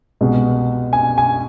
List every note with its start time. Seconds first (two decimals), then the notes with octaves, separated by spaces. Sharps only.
0.21 C2 B2 G#3
0.93 G#5
1.18 G#5